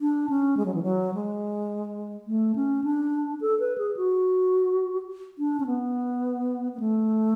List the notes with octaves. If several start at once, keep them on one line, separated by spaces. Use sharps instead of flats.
D4
C#4
G#3
F#3
E3
F#3
G#3
A3
C#4
D4
A4
B4
G#4
F#4
D4
C#4
B3
B3
A3